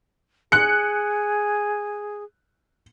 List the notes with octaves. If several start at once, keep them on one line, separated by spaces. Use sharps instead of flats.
G#4 F#6 C#7